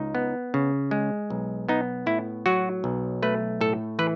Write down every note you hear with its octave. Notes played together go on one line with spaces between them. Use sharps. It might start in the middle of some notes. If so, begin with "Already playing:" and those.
Already playing: C#2 D#4
B3
C#3
G#3
B1
B3 D#4
A2 E4
F#3 F#4
B1
A3 B4
A2 A4
E3 B4